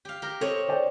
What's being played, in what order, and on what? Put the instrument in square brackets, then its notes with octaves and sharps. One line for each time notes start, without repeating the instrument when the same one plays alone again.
[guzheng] G4 F5
G4 A#4
[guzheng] C4 C#5 D#5 [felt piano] A4
[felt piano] C5 D5 G5